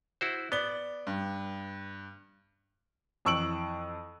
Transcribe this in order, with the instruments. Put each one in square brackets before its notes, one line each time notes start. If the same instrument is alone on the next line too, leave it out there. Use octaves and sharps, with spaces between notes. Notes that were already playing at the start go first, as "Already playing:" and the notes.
[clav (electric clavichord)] E4 F#4 C5
[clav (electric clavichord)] B3 [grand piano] D5 G7
[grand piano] G2
F2 E3 C#6 E6 D7 F#7